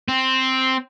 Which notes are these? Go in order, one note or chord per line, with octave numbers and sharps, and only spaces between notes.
C4